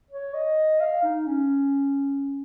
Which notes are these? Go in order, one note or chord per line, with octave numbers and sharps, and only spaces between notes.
C#5
D#5
F5
D#4
C#4